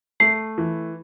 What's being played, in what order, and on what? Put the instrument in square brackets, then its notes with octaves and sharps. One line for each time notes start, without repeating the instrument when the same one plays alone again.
[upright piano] A3 [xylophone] C7
[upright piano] E3